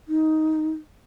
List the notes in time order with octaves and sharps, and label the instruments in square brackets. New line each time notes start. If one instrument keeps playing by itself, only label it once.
[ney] D#4